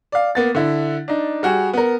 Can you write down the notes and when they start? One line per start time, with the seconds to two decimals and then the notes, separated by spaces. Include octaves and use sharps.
0.12 D5 F5
0.35 A#3 B3 A6
0.55 D3 E4
1.08 D4 D#4
1.43 G3 F#4 G#4
1.73 B3 A#4